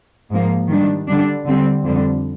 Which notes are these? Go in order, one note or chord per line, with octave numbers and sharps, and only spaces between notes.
G#2 F3 A#3
D#3 G3 D4
D3 G3 D4
D3 G3 C4
F2 D3 G3